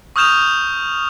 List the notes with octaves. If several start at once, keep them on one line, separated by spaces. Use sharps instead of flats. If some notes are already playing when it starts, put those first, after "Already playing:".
C#6 D#6 F6 G6 E7 F7